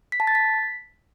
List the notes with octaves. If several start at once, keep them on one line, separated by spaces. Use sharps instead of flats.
B6
A5
A6
B6